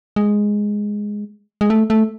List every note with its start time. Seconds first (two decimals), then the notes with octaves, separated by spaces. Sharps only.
0.16 G#3
1.61 G#3
1.70 A3
1.90 A3